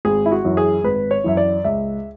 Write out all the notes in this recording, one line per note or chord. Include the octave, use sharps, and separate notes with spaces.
G#1 G#4
E4
F#4
F#2 E3
G#4
G#1 B4
C#5
F#2 E3 E5
D5
C#2 E5